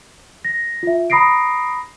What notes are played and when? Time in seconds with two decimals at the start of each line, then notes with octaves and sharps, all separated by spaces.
0.45 A#6
0.83 F4 E5
1.10 A#5 B5 D#6 A#6 C7 D7